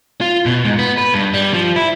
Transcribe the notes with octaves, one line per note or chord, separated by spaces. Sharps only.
F4
B2
G#2
B3
B4
G2
G3
F3
E4